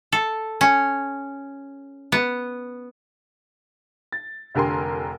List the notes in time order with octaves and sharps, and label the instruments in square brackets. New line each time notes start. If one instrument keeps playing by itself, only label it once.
[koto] A4
C#4
B3
[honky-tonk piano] A6
F1 D3 G4 A#4 G#5 C6